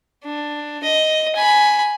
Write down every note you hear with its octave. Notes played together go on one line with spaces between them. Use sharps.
D4
D#5
G#5 B5